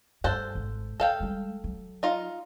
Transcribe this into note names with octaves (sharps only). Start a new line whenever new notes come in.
G2 A4 C5 F#5
G#1 C4
F#1 A4 F5 G5
G3 G#3
F#3
D#4 F4